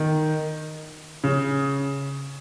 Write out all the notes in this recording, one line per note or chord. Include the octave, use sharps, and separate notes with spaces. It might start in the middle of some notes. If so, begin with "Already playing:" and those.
Already playing: D#3
C#3